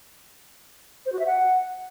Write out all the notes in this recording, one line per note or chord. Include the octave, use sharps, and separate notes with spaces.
C5
F#4
E5
F#5